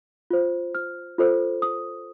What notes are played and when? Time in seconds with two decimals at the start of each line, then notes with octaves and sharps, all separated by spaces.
0.31 F4 C5
0.75 F6
1.18 F4 A4 C5
1.62 D#6